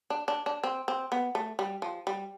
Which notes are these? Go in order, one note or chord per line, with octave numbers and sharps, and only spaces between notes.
D4
D4
D4
C4
C4
B3
A3
G3
F3
G3